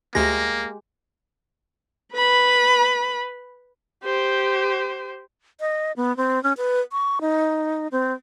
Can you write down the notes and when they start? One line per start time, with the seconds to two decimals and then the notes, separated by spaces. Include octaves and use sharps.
0.15 D2 G#3 A#3 G4 A#6
2.14 B4 B5
4.04 G4 C5
5.60 D#5
5.97 B3
6.17 C4
6.43 C#4
6.57 B4
6.92 C#6
7.21 D#4
7.92 C4